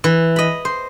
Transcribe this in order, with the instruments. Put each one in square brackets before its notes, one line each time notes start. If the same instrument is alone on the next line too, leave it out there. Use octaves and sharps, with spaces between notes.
[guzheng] E3
D#5 B5
C5